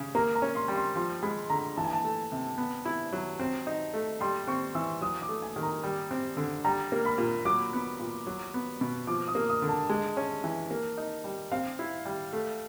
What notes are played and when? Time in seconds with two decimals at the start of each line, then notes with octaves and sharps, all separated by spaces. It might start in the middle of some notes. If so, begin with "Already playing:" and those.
Already playing: C#3
0.15 A#3 A#5
0.35 A#5
0.42 C#4
0.55 C6
0.68 G3
0.76 C6
0.96 F3 C6
1.22 G#3 B5
1.50 D3 A#5
1.77 E3 A5
1.84 G#5
1.92 A5
2.04 A3
2.32 C3
2.58 B3
2.85 E4
3.13 F#3
3.39 C4
3.67 D#4
3.94 A3
4.20 G3 C6
4.47 C4 C#6
4.75 E3 E6
5.01 F#3 D#6
5.22 D6
5.29 A3
5.42 G#5
5.56 D#3
5.62 A#5
5.83 G3
6.11 C4
6.37 D3
6.64 G3 A#5
6.92 A#3
7.05 B5
7.18 A#2
7.45 F#3 D6
7.73 B3
8.00 A#2
8.27 F#3
8.54 B3
8.81 B2
9.07 F3 D6
9.28 D#6
9.35 A#3
9.49 D#6
9.62 D3
9.68 A5
9.89 G#3
10.17 C#4
10.44 E3
10.71 A#3
10.97 D#4
11.24 G3
11.52 C4 F5
11.79 E4
12.05 G3
12.33 A3